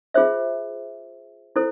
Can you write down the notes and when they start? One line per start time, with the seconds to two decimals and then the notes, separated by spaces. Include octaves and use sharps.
0.14 F4 G#4 C5 E5
1.56 E4 A4 C5